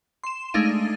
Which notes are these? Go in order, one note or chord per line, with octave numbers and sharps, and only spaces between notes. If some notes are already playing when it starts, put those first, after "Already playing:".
C6 E7
G#3 A3 D4 D#4 F5 D#7